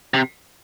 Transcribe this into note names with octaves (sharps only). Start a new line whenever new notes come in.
C3